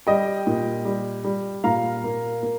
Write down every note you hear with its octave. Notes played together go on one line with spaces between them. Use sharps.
G3 D#5 G5
A#2
G3
G3
A#2 F5 A#5
A#3
A#3